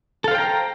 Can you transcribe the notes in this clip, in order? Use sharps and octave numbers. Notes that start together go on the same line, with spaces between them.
A4 C5 F5 G5 A#5